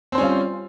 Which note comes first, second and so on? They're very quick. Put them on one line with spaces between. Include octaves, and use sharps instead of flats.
C4 C5 C#4 G3 F4